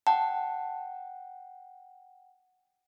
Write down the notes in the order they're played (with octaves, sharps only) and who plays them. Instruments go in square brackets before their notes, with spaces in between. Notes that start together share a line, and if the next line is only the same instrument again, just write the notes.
[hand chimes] F#5 G5 [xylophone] A5